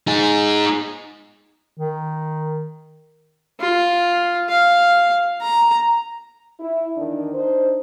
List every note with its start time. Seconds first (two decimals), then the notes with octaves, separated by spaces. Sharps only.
0.07 D#4 G#4
1.77 D#3
3.60 F4
4.49 F5
5.41 A#5
6.60 E4
6.97 E2 D#3 D4
7.34 D4 D#4 C5